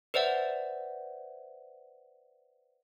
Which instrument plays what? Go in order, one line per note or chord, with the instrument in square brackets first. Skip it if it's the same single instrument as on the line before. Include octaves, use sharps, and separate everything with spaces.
[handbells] B4 C5 D5 E5 F#5